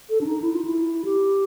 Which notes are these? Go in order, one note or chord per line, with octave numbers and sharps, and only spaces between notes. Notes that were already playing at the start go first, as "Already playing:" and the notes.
A4
D4
D#4
E4
F4
E4
G4